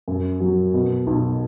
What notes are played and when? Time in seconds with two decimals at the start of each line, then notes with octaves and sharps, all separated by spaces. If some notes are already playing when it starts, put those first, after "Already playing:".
0.08 F#2
0.40 F#3
0.74 B2
1.07 B1